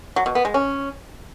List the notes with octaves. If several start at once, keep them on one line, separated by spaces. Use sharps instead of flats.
F#3
B2
B3
G#3
C#4